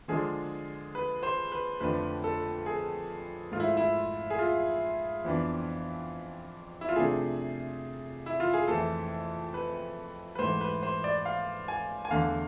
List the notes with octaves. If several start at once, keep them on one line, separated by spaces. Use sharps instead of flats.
D3 F3 G#3 D4 G#4
B4
C5
B4
F2 D3 F3 A3 D4 B4
A4
G#4
G#2 F3 A3 F4
E4
E4
G#4
F4
F2 E3 B3 D4
E4
F4
C3 F3 A3 D4 G#4
E4
F4
G#4
F2 E3 A3 A4
B4
B4
G#2 E3 A3 C5
B4
C5
D5
F5
G#5
G#5
E2 D3 A3 D4 F5